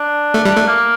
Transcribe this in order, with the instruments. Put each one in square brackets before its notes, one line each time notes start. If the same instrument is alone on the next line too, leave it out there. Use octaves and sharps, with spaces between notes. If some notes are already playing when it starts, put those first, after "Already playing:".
Already playing: [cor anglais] D4
[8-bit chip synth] A3
G3
A3
[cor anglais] A#3